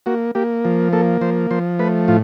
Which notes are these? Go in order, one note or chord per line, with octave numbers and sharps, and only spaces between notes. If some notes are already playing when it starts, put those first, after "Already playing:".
A#3 F#4
A#3 G4
F3
A#3 A4
F3 C5
F3 C5
A3 B4
A2 F4